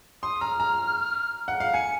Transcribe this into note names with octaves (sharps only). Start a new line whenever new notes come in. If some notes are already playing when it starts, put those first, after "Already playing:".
C6 D#6
A#5 F6
A#5
F#5
F5
G#5 C#7